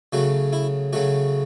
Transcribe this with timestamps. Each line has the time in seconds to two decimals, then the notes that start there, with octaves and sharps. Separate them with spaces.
0.13 C#3 F#3 A3 F#4
0.53 E4
0.93 C#3 F#3 A3 F#4